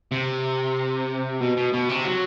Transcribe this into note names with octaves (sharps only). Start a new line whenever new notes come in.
C3
B2
B2
B2
C3
F#3